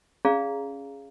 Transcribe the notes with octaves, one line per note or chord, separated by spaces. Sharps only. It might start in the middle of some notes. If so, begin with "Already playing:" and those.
C#4 G#4 D5 F5 A#5